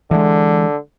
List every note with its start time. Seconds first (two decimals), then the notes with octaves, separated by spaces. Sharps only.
0.11 D3 E3 G#3